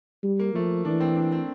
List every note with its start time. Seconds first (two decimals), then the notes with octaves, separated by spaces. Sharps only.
0.23 G3
0.39 A#3
0.54 F3 A3
0.85 E3 D4
1.00 C4
1.16 D4
1.32 C4